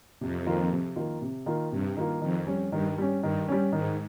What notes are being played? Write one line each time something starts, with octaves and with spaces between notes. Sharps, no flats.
F2 C3
D#3 A#3 F4
C3
D#3 A#3 F4
C3
D#3 A#3 F4
G2 C3
D#3 A#3 F4
F2 D#3
G3 C#4
G2 D#3
G3 C#4
G2 D#3
G3 C#4
G#2 D#3